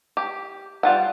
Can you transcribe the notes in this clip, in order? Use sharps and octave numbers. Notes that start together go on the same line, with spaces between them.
G4
G3 F4 F#5